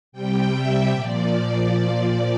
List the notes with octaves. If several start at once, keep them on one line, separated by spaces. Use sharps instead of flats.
C3 G3 G5
E5
A#2 F3 D5
D5